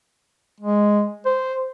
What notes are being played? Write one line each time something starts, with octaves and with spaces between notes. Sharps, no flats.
G#3
C5